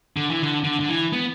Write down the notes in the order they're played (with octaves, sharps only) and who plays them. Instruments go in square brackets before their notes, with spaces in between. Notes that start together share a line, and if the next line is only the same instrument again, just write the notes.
[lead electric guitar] D3
E3
D3
D3
D3
E3
B3